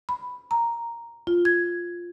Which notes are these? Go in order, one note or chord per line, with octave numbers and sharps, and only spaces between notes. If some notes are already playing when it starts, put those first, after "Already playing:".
B5
A#5
F4
G#6